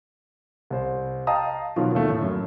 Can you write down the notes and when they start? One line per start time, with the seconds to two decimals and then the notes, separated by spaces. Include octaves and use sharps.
0.70 C2 C5
1.27 D#5 F5 G5 A5 A#5 D#6
1.76 B2 D#3 F3 F#3 F4 F#4
1.95 D#2 A3
2.10 A2
2.22 F#2